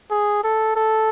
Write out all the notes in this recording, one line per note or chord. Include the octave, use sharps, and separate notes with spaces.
G#4
A4
A4